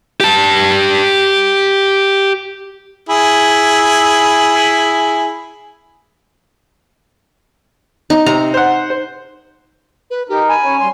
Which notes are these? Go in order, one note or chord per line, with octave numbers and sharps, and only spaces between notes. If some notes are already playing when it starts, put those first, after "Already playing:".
G4 A5
E4 G#4
D#4
C3 A#5
C5 F#5
C5
B4
D#4 G4 A#4
G#5 B5
C#4 C#5
G3 C6